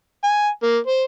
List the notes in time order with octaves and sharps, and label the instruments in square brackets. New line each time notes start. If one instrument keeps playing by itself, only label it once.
[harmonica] G#5
A#3
C5